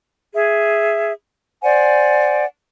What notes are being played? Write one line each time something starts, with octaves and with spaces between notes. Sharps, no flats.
G#4 E5
C5 D5 F#5 G#5